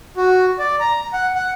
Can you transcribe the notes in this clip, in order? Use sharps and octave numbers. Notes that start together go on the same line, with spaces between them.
F#4
D5
A#5
F#5
F#5